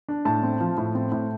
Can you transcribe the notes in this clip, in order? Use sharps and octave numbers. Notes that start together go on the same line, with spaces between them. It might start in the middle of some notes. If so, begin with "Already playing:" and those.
D4
A2 A5
C4
F3
A2
C4
A2